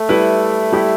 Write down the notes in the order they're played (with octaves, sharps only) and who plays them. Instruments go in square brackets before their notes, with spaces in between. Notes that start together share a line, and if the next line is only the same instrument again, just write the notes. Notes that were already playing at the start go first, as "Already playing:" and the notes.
Already playing: [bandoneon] A3
[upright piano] G3 E4 B4
G3 E4 G4